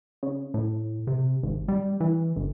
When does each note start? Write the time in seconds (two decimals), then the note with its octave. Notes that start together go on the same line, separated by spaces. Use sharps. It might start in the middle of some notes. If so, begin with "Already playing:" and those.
0.23 C#3
0.54 A2
1.07 C3
1.43 G#1
1.68 G3
2.00 E3
2.36 G1